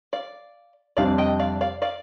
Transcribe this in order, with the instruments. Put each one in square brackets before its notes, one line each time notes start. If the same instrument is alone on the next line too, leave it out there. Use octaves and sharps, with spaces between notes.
[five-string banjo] D5 F5
[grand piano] F2 C3 G3 D4 [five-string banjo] D5 F5
[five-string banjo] D#5 G5
D5 F5
D5 F5
D5 F5